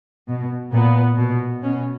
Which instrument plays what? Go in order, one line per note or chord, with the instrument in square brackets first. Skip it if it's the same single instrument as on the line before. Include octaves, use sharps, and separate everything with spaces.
[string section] B2
A#2 B3
B2
B2 C#4